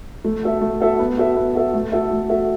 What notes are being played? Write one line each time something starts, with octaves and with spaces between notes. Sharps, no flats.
A3
F#4 A4 E5
A3
F#4 A4 E5
B3
F#4 A4 E5
B3
F#4 A4 E5
A3
F#4 A4 E5
A3
F#4 A4 E5